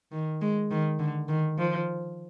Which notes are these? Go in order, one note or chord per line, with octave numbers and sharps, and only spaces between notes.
D#3
G#3
D#3
D3
D#3
F3